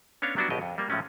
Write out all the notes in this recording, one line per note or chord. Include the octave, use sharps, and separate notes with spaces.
B3 C#4 D4 C#5 F5
F#3 G3 B3 D4 E4 F#4
A#1 B2 G4 D#5
F2
G3 A#3
A2 F3 G#3 A3 C#4